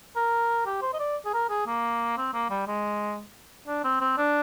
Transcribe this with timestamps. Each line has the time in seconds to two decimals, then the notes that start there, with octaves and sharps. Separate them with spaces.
0.16 A#4
0.66 G4
0.82 C5
0.94 D#5
0.99 D5
1.25 G#4
1.33 A#4
1.50 G#4
1.66 A#3
2.17 C4
2.33 A#3
2.50 G3
2.67 G#3
3.67 D4
3.84 C4
4.00 C4
4.17 D4